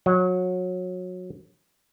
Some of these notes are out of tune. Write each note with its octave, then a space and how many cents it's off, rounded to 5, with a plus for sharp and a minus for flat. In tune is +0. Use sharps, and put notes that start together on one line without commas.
F#3 -25